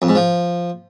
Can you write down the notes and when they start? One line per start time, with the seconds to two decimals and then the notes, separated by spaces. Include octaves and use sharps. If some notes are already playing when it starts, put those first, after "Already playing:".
0.02 F2
0.09 G#2
0.15 F3